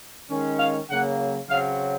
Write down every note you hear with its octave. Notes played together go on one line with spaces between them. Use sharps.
D#3 G#3 C#4
F5
C#3 F#3 A#3 F#5
C#3 F#3 C4 F5